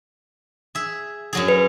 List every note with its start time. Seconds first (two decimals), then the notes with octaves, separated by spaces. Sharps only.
0.75 G#4 E5
1.33 F#2 F#3 G#4
1.48 B4